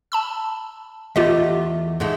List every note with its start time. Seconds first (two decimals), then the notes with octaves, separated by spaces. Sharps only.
0.12 A5 B5 E6
1.16 E2 A3 F4 G4 D#5
2.00 G#2 G#3 A3